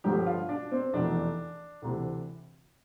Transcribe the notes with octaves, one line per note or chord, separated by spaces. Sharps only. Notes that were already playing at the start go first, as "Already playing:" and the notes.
G1 G2 D3 F3 G4
F4
D4
C4
F1 E2 E3 D4
D2 C3 E3